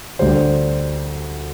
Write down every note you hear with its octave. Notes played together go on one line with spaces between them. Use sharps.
D2 D3 G3 C5